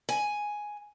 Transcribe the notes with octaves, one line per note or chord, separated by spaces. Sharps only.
G#5